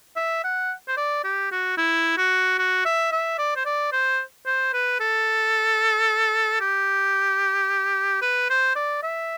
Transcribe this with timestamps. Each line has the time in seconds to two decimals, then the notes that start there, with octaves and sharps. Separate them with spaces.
0.16 E5
0.44 F#5
0.88 C5
0.97 D5
1.24 G4
1.51 F#4
1.77 E4
2.18 F#4
2.59 F#4
2.85 E5
3.12 E5
3.38 D5
3.56 C5
3.65 D5
3.92 C5
4.46 C5
4.73 B4
5.00 A4
6.61 G4
8.22 B4
8.50 C5
8.76 D5
9.03 E5